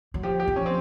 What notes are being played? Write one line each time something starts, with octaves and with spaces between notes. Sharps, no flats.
F#3
F3 G4
G4
F3
C#4
C4